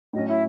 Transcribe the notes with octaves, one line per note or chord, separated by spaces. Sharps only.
A2 F#3 C#4 D#5
E4